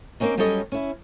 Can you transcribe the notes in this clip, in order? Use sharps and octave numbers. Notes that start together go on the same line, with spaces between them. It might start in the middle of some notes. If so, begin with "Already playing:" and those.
A#3 C4 C#4 D#4
F#3 G3 C#4 A4 C#5 D#5
C#4 E4